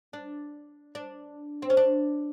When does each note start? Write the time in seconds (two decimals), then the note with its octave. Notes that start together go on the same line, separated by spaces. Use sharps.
0.13 D4
0.95 D4
1.62 C4
1.70 C#4
1.77 D4